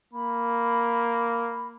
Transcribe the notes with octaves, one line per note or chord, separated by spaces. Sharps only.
A#3 B5